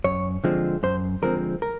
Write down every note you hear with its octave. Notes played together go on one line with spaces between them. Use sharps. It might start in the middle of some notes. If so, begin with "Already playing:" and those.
F#2 C#5
D3 F3 G#3 C4
F#2 C5
D3 F3 G#3 C4 A#4
A#4